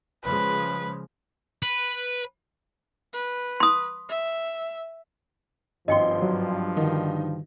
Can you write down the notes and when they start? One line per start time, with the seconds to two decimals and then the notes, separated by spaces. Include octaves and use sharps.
0.25 C#3 F3 G#3 B4
1.63 B4
3.13 B4
3.60 C6 D#6
4.09 E5
5.88 G#1 G2 F3 C#4 D#5 G5 C6
6.22 F#3
6.77 D3 D#3 D#4 F#4